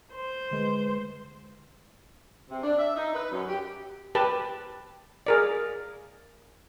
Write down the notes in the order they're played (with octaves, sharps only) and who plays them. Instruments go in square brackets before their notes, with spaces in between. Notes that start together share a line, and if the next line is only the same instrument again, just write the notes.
[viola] C5
[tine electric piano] D3 G#3 B4
[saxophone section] C3
D4
E5
D#4
B4
F#2
G4
[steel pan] G4 B4 A5
G#4 A#4 D5